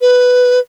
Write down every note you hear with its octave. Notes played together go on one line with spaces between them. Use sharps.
B4